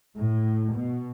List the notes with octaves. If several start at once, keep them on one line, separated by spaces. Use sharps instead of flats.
A2
B2